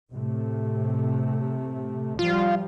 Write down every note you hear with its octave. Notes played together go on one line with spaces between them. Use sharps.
A2 C3 A3
F3 G3 F4